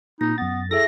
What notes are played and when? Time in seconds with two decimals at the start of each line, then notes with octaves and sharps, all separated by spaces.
0.21 A#2 D#4 A#6
0.38 F#2 B3 A6
0.71 E4 G#4 A4 E5 A#6